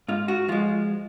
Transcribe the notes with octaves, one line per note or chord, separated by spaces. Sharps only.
G#2 F4
F#4
F3 G#3 F4